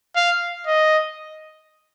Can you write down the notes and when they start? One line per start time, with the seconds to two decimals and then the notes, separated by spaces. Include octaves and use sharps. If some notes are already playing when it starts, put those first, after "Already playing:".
0.16 F5
0.67 D#5